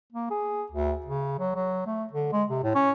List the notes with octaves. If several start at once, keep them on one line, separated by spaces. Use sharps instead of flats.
A#3
G#4
D2
C#3
F#3
F#3
A3
D3
G#3
C3
A2
C#4